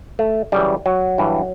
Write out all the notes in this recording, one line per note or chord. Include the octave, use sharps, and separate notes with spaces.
A3
F#2 C#3 E3 G3
F#3
G2 E3